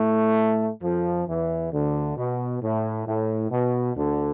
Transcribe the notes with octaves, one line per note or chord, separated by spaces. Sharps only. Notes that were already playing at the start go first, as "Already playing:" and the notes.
Already playing: A2 A3
F2 F3
E2 E3
D2 D3
B2
A2
A2
B2
D2 D3